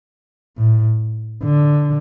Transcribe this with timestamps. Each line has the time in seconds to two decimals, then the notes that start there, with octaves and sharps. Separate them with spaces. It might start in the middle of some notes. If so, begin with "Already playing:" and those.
0.58 A2
1.43 D3